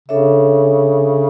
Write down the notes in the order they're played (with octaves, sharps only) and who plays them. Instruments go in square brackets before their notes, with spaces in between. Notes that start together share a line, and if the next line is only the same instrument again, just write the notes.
[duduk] C#3 [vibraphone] D4 A4 C#5 E5